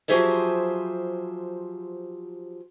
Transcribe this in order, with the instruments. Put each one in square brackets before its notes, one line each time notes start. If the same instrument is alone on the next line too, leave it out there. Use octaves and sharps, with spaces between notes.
[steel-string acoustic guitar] F3 F#3 G4 G#4 C5 E5